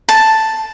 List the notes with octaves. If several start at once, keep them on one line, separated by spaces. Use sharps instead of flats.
A5